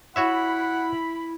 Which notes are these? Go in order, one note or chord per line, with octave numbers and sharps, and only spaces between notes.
E4 F#4 C#5 E5 F#5 B5